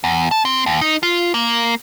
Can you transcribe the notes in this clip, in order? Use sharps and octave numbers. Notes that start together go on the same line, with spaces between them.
E2
A5
C4
D#2
D#4
F4
A#3